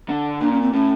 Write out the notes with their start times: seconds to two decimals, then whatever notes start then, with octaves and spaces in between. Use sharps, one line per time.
0.09 D3
0.40 A#2 D4
0.52 C#4
0.62 C4
0.72 A2 C#4